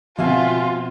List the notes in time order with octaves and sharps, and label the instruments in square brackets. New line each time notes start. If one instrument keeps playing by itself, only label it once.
[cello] B2 [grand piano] F3 C4 F#4 [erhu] F4 [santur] E5 F5 G#5